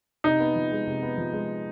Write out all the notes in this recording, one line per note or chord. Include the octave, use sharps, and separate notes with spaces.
C3 D#4
B3
F3
G#3
C3
B3
F3
G#3